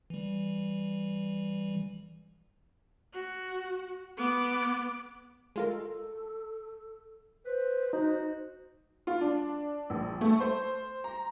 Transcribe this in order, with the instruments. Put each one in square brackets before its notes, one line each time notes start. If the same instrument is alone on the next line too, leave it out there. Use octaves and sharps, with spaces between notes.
[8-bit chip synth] E3 G3
[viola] F#4
B3 D6
[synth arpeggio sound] G#3 F4 A#4 [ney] A4
[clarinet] B4 [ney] C5
[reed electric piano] D#4 [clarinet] F#4
[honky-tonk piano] F4
D4
A#1
A3
C5
A#5